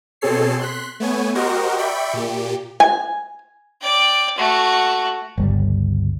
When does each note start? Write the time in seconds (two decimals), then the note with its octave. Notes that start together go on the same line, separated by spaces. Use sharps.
0.21 B2 C4 G#4 A4 C#5 C7
0.59 C6 F#6 B6
1.00 A3 B3 C#5 G#5
1.35 F#4 G4 A#4 C5 D#5
1.78 D5 E5 G5 B5 C#6
2.13 A#2 G4
2.80 G#5
3.81 D5 G5
4.38 A3 F#4
5.38 G1 C#2 G3